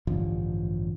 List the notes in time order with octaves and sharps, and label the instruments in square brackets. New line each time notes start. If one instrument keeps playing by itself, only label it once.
[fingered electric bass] A1 G2 D3 F3